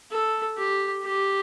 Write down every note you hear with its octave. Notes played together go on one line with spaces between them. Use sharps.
A4
G4
G4